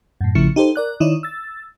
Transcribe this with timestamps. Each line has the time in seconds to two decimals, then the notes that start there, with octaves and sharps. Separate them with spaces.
0.21 F#2 A2
0.35 A1 C#3 F3 A3 E4 C#7
0.56 D#4 G4 A4 C5
0.76 A#4 D5 F#6
1.00 D#3 D#4 E4 C#5 D5
1.23 E6 A6